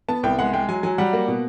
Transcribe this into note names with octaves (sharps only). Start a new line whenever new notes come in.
B3 A5
C2 G5
G#3 F#5
G#3 G5
F#3 G#5
F#3 G#5
G3 F#5
A#3
B2